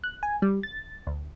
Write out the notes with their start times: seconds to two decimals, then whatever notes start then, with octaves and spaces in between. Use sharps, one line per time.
0.04 F#6
0.23 G#5
0.42 G3
0.63 A6
1.07 D2